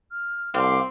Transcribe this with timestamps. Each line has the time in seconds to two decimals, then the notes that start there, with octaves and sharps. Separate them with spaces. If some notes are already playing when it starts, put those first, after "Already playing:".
0.11 F6
0.54 C2 C4 F5 D6